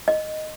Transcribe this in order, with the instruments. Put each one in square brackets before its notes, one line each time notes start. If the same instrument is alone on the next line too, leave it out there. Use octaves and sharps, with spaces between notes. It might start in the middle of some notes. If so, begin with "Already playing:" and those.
[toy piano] D#5